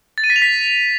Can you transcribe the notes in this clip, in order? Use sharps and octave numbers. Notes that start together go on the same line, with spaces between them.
A6
D#7
B6
F7
B6